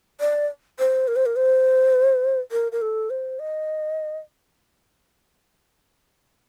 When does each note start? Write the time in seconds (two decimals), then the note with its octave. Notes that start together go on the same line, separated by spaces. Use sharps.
0.20 D5
0.79 C5
1.08 A#4
1.16 C5
1.26 A#4
1.36 C5
2.52 A#4
2.72 A#4
2.82 A4
3.10 C5
3.39 D#5